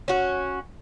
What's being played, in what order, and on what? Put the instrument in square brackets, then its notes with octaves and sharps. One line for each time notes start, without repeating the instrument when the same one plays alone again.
[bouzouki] C#4 F#4